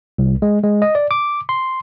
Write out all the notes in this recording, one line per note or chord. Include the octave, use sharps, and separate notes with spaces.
C2
G#3
G#3
D#5
D5
D6
C6